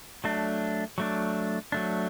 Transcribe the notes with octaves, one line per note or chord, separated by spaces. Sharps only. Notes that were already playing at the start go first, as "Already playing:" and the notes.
F#3 A3 D4
F#3 A3 D4
F#3 A3 D4